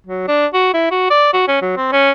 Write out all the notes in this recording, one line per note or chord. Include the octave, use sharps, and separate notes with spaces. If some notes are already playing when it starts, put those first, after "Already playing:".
F#3
D4
F#4
E4
F#4
D5
F#4
C#4
F#3
C4
C#4